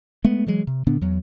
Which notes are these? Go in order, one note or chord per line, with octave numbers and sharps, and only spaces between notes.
G#3 A3 B3
E3 F#3 G#3
C3
A#2 D3 B3 D4
E2 F#3